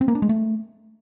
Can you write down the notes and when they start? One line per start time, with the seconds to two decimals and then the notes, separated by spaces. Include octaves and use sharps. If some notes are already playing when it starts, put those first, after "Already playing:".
0.01 C4
0.08 A#3
0.15 D4
0.22 G#3
0.29 A3